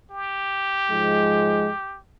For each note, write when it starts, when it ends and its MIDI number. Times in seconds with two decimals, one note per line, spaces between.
0.11 1.99 67
0.91 1.70 44
0.91 1.70 53
0.91 1.70 56